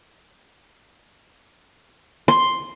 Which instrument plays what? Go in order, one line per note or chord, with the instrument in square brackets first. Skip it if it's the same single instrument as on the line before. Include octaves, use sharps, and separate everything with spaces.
[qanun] C6